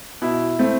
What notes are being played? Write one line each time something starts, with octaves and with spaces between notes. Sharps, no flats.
B2 E4
A3 C4